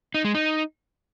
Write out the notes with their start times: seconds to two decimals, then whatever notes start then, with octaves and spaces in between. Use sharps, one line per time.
0.14 D#4
0.25 G#3
0.35 D#4